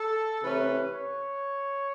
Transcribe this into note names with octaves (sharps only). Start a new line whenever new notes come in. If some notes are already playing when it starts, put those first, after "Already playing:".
Already playing: A4
C3 E3 A3 C#4 B4
C#5